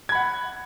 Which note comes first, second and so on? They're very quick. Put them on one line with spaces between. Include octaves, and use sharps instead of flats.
G#6 B5 F#5